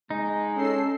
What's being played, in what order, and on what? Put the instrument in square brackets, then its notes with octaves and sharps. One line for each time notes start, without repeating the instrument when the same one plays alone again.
[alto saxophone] G#3 [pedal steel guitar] D#4
[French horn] C#4 [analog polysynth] A4 E6 C7